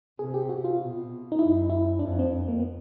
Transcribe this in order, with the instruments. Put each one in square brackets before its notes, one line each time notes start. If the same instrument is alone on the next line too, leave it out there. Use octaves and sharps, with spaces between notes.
[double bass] C3 [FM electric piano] G#4
[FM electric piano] G4
F#4
F4
[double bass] B2
[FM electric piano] D#4
[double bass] F#2 [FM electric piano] E4
[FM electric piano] E4
[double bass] F2 [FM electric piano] D4
[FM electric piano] C4
A#3
B3